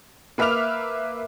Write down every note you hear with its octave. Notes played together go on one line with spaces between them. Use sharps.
A#3 B4 E5 D6 F6 F7